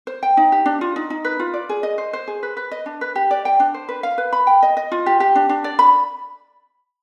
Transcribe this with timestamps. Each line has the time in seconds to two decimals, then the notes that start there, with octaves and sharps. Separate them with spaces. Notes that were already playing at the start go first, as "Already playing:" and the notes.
0.07 C5
0.23 G5
0.37 D#4
0.52 G4
0.66 D4
0.81 F4
0.96 D#4
1.10 D#4
1.25 B4
1.39 F4
1.54 D5
1.69 G#4
1.83 D#5
1.98 C5
2.13 C5
2.28 G#4
2.43 B4
2.57 B4
2.72 D#5
2.86 D4
3.01 B4
3.16 G4
3.31 D5
3.45 G5
3.60 D4
3.74 C5
3.89 B4
4.03 F5
4.18 B4
4.33 B5
4.47 G5
4.63 D#5
4.77 D#5
4.92 F4
5.06 G4
5.20 G4
5.35 D4
5.49 D4
5.64 D5
5.79 B5